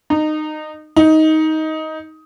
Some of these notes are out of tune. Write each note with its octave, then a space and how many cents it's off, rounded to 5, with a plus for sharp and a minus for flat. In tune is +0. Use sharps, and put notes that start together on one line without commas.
D#4 -20
D#4 +15